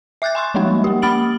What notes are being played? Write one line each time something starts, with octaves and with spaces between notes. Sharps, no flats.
E5 D6 F#6 G6 A6
G#5 C6 C#6 F#6
F3 G3 G#3 A#3 D#4
A#3 G4
A#3 B5 F6 A6 D7 F#7